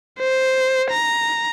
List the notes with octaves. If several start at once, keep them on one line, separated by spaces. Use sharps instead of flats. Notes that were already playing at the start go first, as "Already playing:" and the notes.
C5
A#5